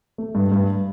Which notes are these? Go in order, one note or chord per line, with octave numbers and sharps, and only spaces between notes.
A3
G2
G2